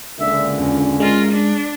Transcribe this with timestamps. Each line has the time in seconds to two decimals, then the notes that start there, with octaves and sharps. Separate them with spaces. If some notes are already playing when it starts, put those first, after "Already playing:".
0.20 C#2 A#2 D3 E5
0.58 E2 C#4
1.00 G#3 F4 A#4
1.31 D4